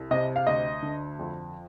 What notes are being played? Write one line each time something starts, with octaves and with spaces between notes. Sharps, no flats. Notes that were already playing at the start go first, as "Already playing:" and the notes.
Already playing: C2
C3 D#5
F5
D2 D#5
D3
F2